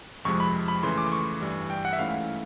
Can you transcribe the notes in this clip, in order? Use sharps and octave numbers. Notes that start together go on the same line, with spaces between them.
F2 C3 F3 G#3 C#6
B5
B5
C#3 E3 A3 C6
D6
C#6
G2 E3 G3
G5
F#5
E5
G#2 E3 A3 C#4 E4 F5